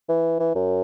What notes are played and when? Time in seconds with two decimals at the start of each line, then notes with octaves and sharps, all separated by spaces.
0.09 E3
0.39 E3
0.55 F#2